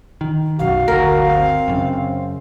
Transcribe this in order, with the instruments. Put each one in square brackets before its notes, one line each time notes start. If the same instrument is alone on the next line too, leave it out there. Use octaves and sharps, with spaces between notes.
[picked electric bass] D#3
[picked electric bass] B1 F#2 [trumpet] F#4 [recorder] F5
[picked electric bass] G1 D2 [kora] A#4
[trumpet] C4
[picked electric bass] F#2 C#3